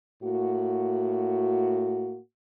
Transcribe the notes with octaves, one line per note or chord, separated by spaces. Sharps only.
A2 A#3 F#4